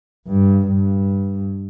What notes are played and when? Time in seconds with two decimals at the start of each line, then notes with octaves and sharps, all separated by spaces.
0.27 G2
0.67 G2